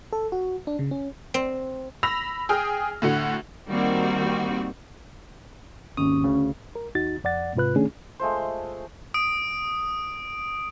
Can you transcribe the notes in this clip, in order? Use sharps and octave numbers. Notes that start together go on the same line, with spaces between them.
A4
F#4
D4
C#3
C#4
C4
B5 E6 A#6 F7
G#4 G5 D#6 F6
A2 D3 F#4 F#5
D#3 G3 A#3 C4 F#4
G#1 D#2 C#4 D#6
D2 C#3
A#4
D#2 D#4 F#4 A6
F2 D5 F#5 A6
G#2 C3 F4 B4 F#6
D#3 A3 C#4 D4 G#4
G#3 A3 F4 C5
D#6 D7